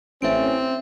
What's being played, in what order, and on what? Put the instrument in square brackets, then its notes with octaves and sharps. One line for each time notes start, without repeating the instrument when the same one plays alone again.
[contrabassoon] A1 [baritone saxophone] C4 [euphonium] C#4 [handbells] E5 D7